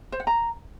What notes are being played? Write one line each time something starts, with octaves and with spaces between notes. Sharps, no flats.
C5
F#5
A#5